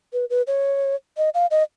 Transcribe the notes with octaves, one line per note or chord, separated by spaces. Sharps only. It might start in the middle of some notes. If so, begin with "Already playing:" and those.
B4
B4
C#5
D#5
F5
D#5